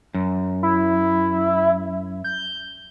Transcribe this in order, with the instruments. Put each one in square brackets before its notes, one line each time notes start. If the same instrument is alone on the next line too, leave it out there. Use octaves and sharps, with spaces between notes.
[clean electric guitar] F#2
[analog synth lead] E4
G6